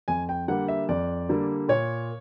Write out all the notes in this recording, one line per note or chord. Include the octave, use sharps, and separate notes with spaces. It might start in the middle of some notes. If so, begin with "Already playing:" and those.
F2 G#5
G5
D3 G3 A#3 F#5
E5
F2 D5
D3 G3 A#3
A#2 C#5